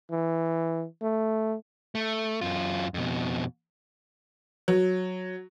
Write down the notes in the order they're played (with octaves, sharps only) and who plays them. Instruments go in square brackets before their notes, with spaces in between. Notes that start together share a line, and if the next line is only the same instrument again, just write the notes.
[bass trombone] E3
A3
[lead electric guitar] A3
F#2 F4
F2 B2
[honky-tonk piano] F#3